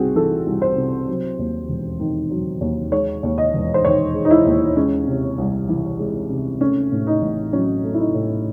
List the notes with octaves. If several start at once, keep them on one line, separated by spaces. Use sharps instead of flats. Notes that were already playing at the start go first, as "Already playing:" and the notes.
Already playing: C2 C3 C4 F#4 G#4
E3 A4
C2
C5
C3
F#3
D#2
E1
D#3
F#3
D#2
G#3 C#5
D#2
D#5
E1
C5
D#3 C#5
G#3
D#4
E4
D#2
G#3 C#4
C3
C2
E3
G#3
C3
A3 C#4
A2
D#4
A1
F#3 C#4
A3
E4
D#4
A2